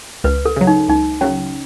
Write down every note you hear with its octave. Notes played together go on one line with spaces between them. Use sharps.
C#2 B4
A4
C#3 F#3
D#4
C#2 D#4
C#3 F#3 C#4